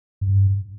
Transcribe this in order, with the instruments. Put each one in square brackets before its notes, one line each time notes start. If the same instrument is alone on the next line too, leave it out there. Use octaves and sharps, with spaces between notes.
[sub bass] G2